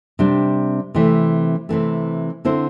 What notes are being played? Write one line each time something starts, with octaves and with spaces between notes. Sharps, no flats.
C3 G3 D4
C3 E3 A3
C3 E3 A3
D3 C4 E4 C5